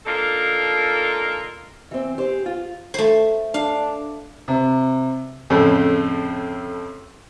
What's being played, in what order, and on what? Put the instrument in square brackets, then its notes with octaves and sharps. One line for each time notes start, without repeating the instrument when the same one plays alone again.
[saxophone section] A#3 D4 D#4 F4 A4 A#4
[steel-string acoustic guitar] E3 C4
G4 G#4 C5
F4
[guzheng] A3 C5
[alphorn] D4 [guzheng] F5
[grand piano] C3
[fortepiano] F2 A2 C#3